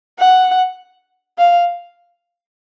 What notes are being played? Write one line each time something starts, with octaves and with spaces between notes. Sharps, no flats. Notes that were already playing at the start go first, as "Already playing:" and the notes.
F#5
F5